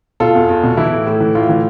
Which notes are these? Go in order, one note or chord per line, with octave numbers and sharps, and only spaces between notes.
B2 F4 A4
E2
E2
B2
E3 E4
A2
A2
E3
A2 F4
E3